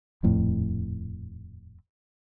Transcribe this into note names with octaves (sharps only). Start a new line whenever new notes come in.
D#1 F2 A2